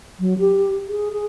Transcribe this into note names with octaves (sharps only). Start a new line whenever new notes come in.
F#3
G4
G#4
G#4